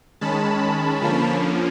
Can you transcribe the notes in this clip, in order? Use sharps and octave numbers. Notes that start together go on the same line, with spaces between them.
D#3 G#3 C#4 A5 B5
D3 F3 A#3 C#4